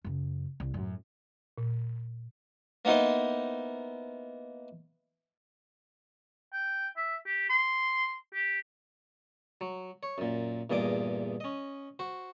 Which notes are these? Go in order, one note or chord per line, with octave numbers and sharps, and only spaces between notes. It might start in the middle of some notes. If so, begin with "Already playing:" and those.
F#2 C#3
C2
F#2 A2
A#2
A#3 B3 D#4 E4 C5
G5
E5
G4
C6
G4
F#3
C#5
F#2 A#2
E2 G2 A#2 G#4 D#5 D6
C#4 D#5
F#4 C5